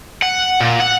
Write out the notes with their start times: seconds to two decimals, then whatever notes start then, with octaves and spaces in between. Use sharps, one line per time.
0.22 F#5
0.60 A#2
0.80 F#5